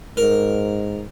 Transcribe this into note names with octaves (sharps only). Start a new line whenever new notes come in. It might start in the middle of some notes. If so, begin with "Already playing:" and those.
G#2 A#4